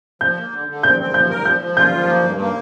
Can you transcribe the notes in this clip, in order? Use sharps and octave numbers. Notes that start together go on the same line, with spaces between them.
F3 G6
A#3
D3
D3
C4 G6
C4
F3 G6
A#4
F3 G6
F3
F4 G6
F3
A#3
G2
A#3